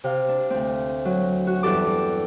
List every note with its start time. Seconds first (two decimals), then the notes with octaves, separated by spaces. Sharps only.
0.04 C3 F5
0.28 D4
0.50 D2 C4
1.05 F#3
1.47 F#4
1.63 E2 G2 E3 G4 A4 D6